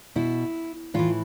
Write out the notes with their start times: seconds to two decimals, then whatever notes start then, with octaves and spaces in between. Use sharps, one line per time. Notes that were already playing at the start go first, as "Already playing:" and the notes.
0.15 B2 E4
0.94 A2 E3 F4